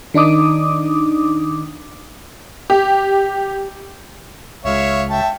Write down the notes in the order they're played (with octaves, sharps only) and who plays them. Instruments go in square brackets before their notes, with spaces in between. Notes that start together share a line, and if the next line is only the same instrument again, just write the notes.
[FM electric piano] D#3 D4 D#4 D6 D#6
[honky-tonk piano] G4
[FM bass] C#2 [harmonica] C#5 E5 F5
[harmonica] E5 G5 A5